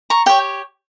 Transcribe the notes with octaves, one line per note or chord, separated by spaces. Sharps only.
A#5 C#6
G4 C#5 G5